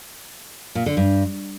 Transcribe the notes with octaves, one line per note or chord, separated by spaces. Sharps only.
A#2
D3
G2